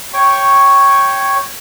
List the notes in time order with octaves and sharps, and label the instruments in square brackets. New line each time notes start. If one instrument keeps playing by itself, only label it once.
[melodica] C#5 G5 C#6